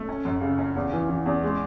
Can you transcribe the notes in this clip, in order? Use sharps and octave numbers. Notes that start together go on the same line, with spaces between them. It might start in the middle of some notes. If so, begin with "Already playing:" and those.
Already playing: A3
C#4
F#2
C#3
C#4
E2
E3
E3
E2
G#3